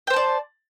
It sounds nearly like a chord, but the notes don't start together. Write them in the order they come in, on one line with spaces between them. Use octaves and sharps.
G5 C5 A5 D5